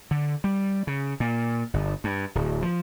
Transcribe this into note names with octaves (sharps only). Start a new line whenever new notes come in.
D3
G3
C#3
A#2
G1
G2
D1
F3